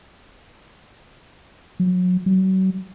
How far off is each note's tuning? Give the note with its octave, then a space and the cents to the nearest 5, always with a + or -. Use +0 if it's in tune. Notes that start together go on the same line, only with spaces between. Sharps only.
F#3 -30
F#3 +35